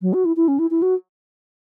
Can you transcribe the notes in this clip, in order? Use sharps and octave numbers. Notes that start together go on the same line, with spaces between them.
F#3
F#4
E4
E4
C#4
E4
E4
F#4